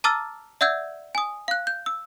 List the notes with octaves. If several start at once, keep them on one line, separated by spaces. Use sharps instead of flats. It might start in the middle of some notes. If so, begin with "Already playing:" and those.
A5 A#5 D6 E6 F6 A6
D5 E5 F#5 E6 G6 G#6
G#5 D#6
F5 F#6
G6
E6